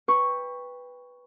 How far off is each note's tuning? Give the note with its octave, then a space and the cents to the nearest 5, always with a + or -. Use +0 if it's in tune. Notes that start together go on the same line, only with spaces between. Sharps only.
B4 +0 G5 +25 C#6 +0